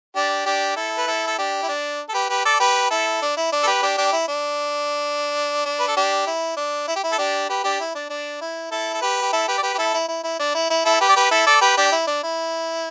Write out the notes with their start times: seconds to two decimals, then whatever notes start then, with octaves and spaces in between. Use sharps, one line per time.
0.15 D4 G4
0.46 D4 G4
0.76 E4 A4
0.98 B4
1.07 E4 A4
1.27 A4
1.38 D4 G4
1.63 E4
1.69 D4
2.09 A4
2.14 G4 B4
2.29 G4 B4
2.45 A4 D5
2.60 G4 B4
2.90 E4 A4
3.22 D4
3.37 E4
3.53 D4
3.63 A4
3.67 G4 B4
3.82 D4 G4
3.97 D4 G4
4.13 E4
4.28 D4
5.65 D4
5.80 B4
5.88 A4
5.97 D4 G4
6.27 E4
6.57 D4
6.88 E4
6.96 G4
7.04 E4
7.12 A4
7.18 D4 G4
7.49 G4 B4
7.64 D4 G4
7.80 E4
7.95 D4
8.10 D4
8.41 E4
8.72 E4 A4
8.94 A4
9.02 G4 B4
9.22 G4
9.33 E4 A4
9.48 G4 B4
9.58 D5
9.63 G4 B4
9.74 G4
9.78 E4 A4
9.94 E4
10.08 E4
10.24 E4
10.39 D4
10.55 E4
10.70 E4
10.86 E4 A4
11.01 G4 B4
11.09 D5
11.16 G4 B4
11.31 E4 A4
11.47 A4 D5
11.61 G4 B4
11.77 D4 G4
11.92 E4
12.07 D4
12.23 E4